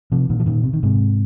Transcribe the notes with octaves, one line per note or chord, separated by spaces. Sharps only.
C3 F3
A#2 D#3
F3
A#2 D#3
C3
D#3
G#2 C3